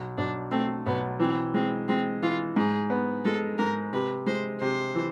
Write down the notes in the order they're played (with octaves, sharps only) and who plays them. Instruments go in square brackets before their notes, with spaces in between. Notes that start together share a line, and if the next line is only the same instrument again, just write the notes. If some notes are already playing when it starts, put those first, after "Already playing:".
Already playing: [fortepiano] B1
[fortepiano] B1 [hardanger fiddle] D4
[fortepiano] A3 [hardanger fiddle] C4
[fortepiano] B1 [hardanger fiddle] B3
[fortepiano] E3 [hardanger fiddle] C4
[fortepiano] G#3 [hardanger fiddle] C4
[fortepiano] G#3 [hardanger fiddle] C4
[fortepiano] E3 [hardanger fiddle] F4
[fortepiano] G#2 [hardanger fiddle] G#4
[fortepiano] B3
[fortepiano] G#3 [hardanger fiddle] A4
[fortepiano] G#2 [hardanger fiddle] A#4
[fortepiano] C3 [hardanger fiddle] B4
[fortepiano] G#3 [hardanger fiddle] C5
[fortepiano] C3 [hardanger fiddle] C5
[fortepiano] E3